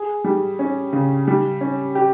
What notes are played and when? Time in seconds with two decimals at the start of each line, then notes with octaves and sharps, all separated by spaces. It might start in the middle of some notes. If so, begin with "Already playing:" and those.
Already playing: G#4
0.24 G3
0.59 C#4
0.93 C#3
1.28 G3
1.61 C#4
1.95 G4